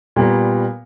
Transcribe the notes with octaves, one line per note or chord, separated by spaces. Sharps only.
A#2 G3 B3 A#4